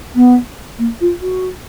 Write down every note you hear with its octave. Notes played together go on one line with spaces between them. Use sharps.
B3
A#3
F4
F#4